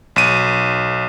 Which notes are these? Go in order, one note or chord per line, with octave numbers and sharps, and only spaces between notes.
B1 D#7